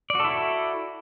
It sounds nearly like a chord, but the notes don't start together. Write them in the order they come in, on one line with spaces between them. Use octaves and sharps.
D5 F#4 A4 E4